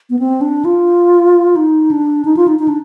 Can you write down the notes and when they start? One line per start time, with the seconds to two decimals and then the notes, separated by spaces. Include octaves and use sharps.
0.10 B3
0.19 C4
0.41 D4
0.65 F4
1.56 D#4
1.91 D4
2.25 D#4
2.37 F4
2.48 D#4
2.59 D#4
2.68 D4